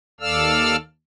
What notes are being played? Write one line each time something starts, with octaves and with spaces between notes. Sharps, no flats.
D#2 A4 D5 F5 E6 F6